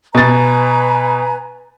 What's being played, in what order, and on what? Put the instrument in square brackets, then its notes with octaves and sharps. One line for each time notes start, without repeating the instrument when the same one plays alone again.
[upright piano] B2 A6 [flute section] B4 G#5 A#5